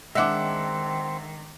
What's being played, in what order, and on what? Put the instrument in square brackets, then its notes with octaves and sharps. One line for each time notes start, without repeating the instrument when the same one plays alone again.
[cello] D#3 [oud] G#3 D4 [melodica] C4 [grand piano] E5 F#5 D6